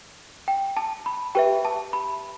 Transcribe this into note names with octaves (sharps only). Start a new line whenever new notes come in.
G5
A5
B5
G4 B4 E5 G5
A5
B5